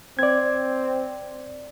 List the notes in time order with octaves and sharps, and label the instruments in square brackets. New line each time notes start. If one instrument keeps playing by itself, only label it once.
[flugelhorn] C4 [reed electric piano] D5 G#6